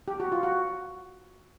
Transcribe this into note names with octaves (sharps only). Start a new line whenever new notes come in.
G4
F#4
F4
F#4